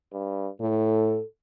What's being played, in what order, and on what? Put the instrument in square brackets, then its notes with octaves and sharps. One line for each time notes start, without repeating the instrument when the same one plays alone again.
[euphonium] G2
[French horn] A2 [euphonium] A4